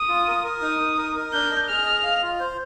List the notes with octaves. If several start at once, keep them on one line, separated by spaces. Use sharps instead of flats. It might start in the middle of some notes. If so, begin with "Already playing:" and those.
Already playing: D#6
F4
A#4
A#4
D#4 D#6
D#4
A#4
A#4
D4 G6
D#5
G#4 F6
D#5
F5
F4
C5